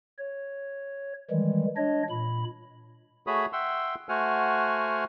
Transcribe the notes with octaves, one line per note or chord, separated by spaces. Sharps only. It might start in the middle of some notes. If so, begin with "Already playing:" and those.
C#5
D#3 E3 G3 G#3
D4 C#5 D#5
A#2 B5
A3 F#4 G#4 C#5 B5 D#6
E5 F#5 G5 C6 E6
A3 F#4 C5 F#5 G#5 F6